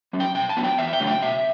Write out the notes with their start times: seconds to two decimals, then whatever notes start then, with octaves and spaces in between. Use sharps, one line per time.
0.13 F#3 C#4
0.20 G5
0.35 B2 G5
0.49 A5
0.57 F#3 B3 D4
0.64 G5
0.78 E2 E5
0.93 G5
1.00 C#3 F#3 A3 D4
1.07 G5
1.22 B2 E5